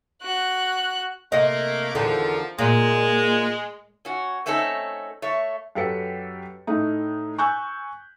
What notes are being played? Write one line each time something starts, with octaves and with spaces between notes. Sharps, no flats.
F#4 F#6
C3 A3 A#3 D#5
E2 D3 D#3 F3
A#2 G#3
C#4 F#4
A3 C4 C#4 D#4 A4
A3 C#5
F#2 G4 A4 B4 C#7
A2 A3 D#4
G#5 C#6 E6 F#6 G6